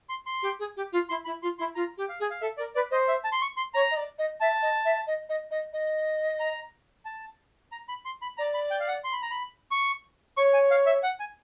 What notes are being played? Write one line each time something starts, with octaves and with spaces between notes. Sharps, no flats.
C6
C6
G4
G#4
G4
F4
E4 C6
E4 B5
F4 C6
E4 C6
F4 A#5
G4
F5
G#4
F5
A4 E5
A#4 D5
B4 D5
C5 D#5
E5
A5
C6
C#6
C6
C#5 A#5
D#5
D5
D#5
E5 A5
D#5
E5
D#5
D#5
D#5
D#5
A#5
A5
A#5
B5
C6
B5
D5 A#5
B5
G5
F5
F#5
C6
B5
A#5
B5
C#6
C#5 C#6
G#5
F5
E5
F#5
G#5